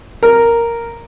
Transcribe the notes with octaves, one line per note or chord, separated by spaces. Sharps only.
A#4